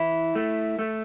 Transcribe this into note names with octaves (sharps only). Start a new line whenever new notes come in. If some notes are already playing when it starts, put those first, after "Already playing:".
Already playing: E3 E4
A3
A3